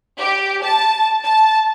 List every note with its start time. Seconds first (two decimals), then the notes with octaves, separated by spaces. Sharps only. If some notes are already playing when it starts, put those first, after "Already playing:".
0.19 G4
0.63 A5
1.23 A5